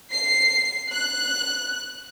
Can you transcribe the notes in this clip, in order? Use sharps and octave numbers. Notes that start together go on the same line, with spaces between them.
C7
F#6